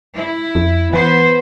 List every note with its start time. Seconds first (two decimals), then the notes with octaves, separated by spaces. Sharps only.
0.16 E4
0.55 F2
0.93 E3 B3 B4 C5